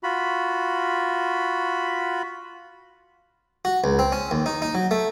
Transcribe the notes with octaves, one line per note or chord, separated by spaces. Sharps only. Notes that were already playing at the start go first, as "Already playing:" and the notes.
F4 F#4 B5
F#4
C#2
C4
C#4
D#2
D#4
D#4
F#3
A3